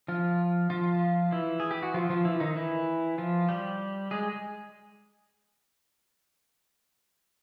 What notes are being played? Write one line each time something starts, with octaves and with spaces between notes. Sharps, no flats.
F3 F4
F3 F4
E3 E4
G#4
G4
F#4
F3 F4
F3 F4
E3 E4
D#3 D#4
E3 E4
F3 F4
G3 G4
G#3 G#4